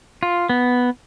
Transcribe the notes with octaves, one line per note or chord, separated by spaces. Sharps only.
F4
B3